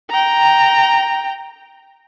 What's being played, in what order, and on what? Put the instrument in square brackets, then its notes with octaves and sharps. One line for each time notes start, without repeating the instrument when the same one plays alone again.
[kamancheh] G5 A#5